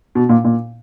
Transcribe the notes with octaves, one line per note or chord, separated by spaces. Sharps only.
B2
A#2
A#2